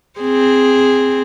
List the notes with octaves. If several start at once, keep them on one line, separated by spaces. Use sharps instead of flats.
C4 G#4